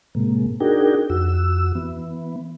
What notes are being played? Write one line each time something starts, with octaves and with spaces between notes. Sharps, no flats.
A2 C3 G#3 A#3
D4 D#4 F#4 G#4 A#4 G5
F2 F#4 E6
E3 B3